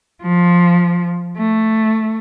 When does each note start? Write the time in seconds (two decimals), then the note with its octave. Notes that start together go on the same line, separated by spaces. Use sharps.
0.22 F3
1.37 A3